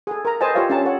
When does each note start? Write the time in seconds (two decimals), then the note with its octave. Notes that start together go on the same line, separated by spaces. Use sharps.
0.07 G#4 A4
0.25 A#4 A#5
0.41 A4 B4 C5 D#5 G#5 A5
0.55 F4 G4 C5 C#5 E5 F5
0.70 C#4 D4 G4 A4 A5 A#5
0.85 A4 C#5 F#5